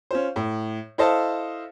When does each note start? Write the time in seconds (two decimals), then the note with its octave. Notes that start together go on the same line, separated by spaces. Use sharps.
0.11 C#4 F4 C5
0.36 A2
0.98 E4 A4 C5 D#5 F5 A5